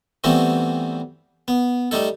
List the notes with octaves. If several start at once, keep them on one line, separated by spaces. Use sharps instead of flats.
E3 G3 A3 B3 C4 F#4
B3
G3 A3 D#4 A4